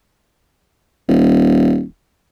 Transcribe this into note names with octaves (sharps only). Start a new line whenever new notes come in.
D#1